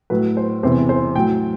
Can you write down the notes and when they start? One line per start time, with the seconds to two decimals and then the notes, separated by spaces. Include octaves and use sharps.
0.10 A2 F#3 B4
0.37 C5
0.63 E2 C3 E3 C5
0.89 C5
1.15 A2 F#3 G5